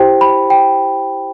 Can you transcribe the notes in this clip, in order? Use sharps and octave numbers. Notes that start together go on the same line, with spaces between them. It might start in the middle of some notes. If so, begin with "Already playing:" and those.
Already playing: E4 G4 C5 G5
B5
G5